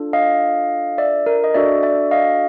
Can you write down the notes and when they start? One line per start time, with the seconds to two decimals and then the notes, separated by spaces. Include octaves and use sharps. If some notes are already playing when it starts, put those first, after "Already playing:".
Already playing: D4 F4 A4
0.13 D#5 F5
0.98 D5 E5
1.26 A#4
1.44 D#5
1.54 D4 F#4 A4 D5 E5
1.83 D5 E5
2.11 D#5 F5